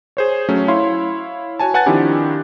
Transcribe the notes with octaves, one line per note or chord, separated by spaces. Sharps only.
G#4 C5 C#5
F#3 A3 C#4
E4 C#5 F5 C6
F#4 C#5 G#5 A5
B4 F#5 G#5 A5 F#6 A6
D#3 F3 C4 D4 E4 G4